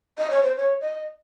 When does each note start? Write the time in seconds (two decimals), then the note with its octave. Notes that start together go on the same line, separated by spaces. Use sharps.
0.18 D#5
0.30 C#5
0.43 C5
0.56 C#5
0.81 D#5